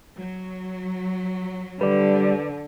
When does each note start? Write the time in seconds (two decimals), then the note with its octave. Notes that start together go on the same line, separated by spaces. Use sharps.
0.16 F#3
1.81 D3 G3 B4 D5